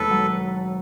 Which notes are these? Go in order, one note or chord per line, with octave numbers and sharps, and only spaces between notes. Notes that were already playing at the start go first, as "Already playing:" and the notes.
Already playing: E1 D#2 A4 B4
F#3